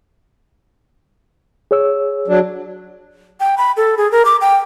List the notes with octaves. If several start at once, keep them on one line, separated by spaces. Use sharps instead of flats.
G#4 C#5 E6
F#3 D4
G5
B5
A4
G#4
A#4
D6
G5